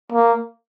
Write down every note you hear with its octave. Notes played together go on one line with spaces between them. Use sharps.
A#3